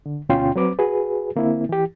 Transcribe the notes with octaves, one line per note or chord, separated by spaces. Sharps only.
D3
D2 B2 C#4 F4 G5 C6
F#3 C4 B4 D6
F#4 G#4 B4
D3 A#3 C4 E4
E3 G4